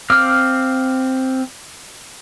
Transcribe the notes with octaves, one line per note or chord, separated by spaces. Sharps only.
C4 F5 D6 F6